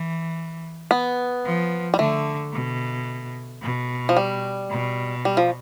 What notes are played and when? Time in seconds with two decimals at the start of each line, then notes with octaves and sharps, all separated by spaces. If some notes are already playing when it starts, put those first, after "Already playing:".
Already playing: E3
0.91 B3
1.45 F3
1.94 G3
1.99 D3 A3
2.53 B2
3.62 B2
4.09 F3
4.17 G3
4.71 B2
5.25 G3
5.37 F3